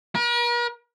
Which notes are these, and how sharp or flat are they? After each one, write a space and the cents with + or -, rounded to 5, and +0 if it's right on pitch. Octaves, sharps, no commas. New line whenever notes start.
A#4 +45